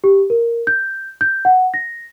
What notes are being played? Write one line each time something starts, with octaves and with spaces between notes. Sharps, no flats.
G4
A#4
G6
G6
F#5
A#6